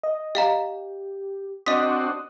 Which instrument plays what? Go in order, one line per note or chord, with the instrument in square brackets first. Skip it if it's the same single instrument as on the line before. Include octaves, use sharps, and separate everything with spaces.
[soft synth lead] D#5
[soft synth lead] G4 [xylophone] D#5 F5 A#5
[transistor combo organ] C4 D4 F#4 [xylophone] D#5 B6 [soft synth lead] D#6